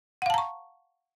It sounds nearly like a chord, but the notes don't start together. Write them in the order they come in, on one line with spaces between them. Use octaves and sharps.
F#5 F5 A5 A#5 C#6